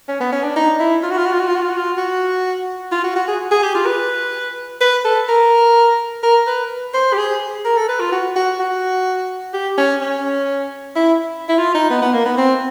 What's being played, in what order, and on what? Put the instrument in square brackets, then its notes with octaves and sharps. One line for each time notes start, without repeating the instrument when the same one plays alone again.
[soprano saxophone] C#4
B3
C#4
D4
D#4
E4
F4
F#4
F4
F#4
F4
F#4
F4
F#4
F4
F#4
F4
F#4
F4
F#4
F#4
G#4
G#4
G4
F4
B4
B4
A4
A#4
A#4
B4
C5
G4
G#4
A#4
A4
B4
F4
F#4
F#4
F#4
G4
C#4
C#4
E4
E4
F4
D#4
B3
B3
A#3
B3
C4